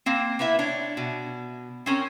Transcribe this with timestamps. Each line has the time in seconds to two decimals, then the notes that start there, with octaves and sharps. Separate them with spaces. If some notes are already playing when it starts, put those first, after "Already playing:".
0.06 A#3 C4
0.39 A#3 B3 E4 E5
0.59 D4 C#5
0.97 B2
1.86 C4 C#4 A#4